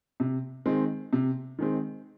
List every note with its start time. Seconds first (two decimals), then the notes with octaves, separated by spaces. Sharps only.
0.20 C3
0.66 D#3 G#3 C4
1.13 C3
1.59 D#3 G#3 C4